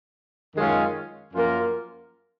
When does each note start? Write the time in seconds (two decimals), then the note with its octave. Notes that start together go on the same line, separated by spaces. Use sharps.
0.56 F#2 D#3 G#3 C#4 F4
1.34 F#2 F3 A#3 F4 A#4